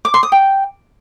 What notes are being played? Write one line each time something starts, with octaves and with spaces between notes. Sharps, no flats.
D6
C6
D#6
G5